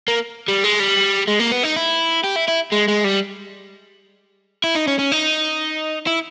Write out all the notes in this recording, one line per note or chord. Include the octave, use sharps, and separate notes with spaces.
A#3
G3
G#3
G3
G#3
A#3
B3
D#4
E4
G4
E4
E4
G#3
G#3
G3
E4
D#4
C#4
C#4
D#4
E4